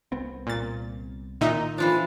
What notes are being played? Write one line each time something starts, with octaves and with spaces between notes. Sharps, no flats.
C2 B3 C4
A#2 A6
A#2 D#3 D#4 E5
E3 F3 D4 F4